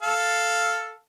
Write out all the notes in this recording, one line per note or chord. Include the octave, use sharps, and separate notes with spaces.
A4 F5